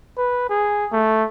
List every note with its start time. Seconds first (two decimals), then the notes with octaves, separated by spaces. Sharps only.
0.18 B4
0.49 G#4
0.92 A3